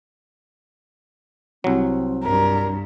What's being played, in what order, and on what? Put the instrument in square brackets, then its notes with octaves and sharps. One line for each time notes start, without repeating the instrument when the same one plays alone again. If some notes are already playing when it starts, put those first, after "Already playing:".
[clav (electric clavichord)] C2 F#3 [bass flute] C4
[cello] G2 [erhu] A#4